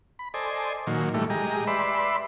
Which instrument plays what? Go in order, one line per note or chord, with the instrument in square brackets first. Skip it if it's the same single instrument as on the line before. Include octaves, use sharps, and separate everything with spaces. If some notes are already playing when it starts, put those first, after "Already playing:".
[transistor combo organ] B5
A4 C5 D5 D#5 G#5
A#2 D#3 F#3
A2 E3 G3 A3
G#3 G4 D#5 A#5
B4 D5 E5 B5 C6